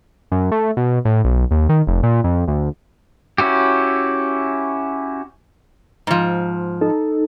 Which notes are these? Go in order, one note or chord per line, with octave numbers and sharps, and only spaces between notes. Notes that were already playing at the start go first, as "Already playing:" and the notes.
F#2
A3
B2
A2
B1
D#2
D#3
F1
A#2
F2
D2
C#4 E4 F#4 G4
G#2 F3
D#4 A4